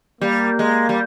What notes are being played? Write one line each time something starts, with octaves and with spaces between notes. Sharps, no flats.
G3 A#3
G#3
G3